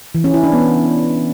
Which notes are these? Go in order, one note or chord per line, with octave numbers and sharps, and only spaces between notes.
E3
C#4
E4
D4
B3